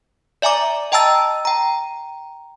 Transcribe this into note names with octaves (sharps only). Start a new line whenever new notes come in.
D5 E5 G#5 A#5 D6
D#5 G5 A5 A#5 E6 A6
G5 A#5